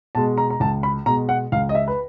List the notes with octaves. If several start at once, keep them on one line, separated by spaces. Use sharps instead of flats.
B2 G#3 A5
A#5
A#5
C#2 A5
B5
B2 G#3 A#5
F#5
C#2 F5
D#5
E5
B4